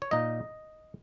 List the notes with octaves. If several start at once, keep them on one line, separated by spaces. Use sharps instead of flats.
C#5
A#2 A#3 D#4 D#5